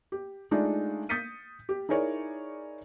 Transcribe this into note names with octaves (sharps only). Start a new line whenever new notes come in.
G4
G#3 A3 D4 D#4 F4
D#6 G6 A6 B6 C#7 D#7
G4
D#4 E4 G#4 A#4 C#5 D5